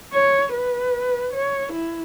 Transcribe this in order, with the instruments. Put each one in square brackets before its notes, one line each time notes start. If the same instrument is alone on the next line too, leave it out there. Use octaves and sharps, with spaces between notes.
[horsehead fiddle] C#5
B4
C#5
E4